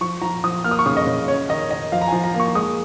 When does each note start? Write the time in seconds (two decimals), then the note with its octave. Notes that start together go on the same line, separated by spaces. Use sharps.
0.01 F3 C#6
0.22 F3 A#5
0.44 F3 D#6
0.64 A#3 F6
0.71 D#6
0.79 C#6
0.86 C#3 D#6
0.97 D#5
1.07 C#3
1.27 C#4 C#5
1.49 D#3 D#5
1.71 D#3 D#5
1.92 F3 F5
2.01 A#5
2.08 F3 G#5
2.24 A#5
2.34 A#3
2.40 C#6
2.55 G#3 D#6